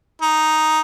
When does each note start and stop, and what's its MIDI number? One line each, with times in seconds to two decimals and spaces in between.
0.22 0.81 63